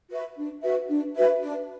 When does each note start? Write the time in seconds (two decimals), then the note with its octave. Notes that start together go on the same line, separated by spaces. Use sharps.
0.10 F#4 B4 E5
0.37 D4
0.63 F#4 B4 E5
0.89 D4
1.15 F#4 B4 E5
1.42 D4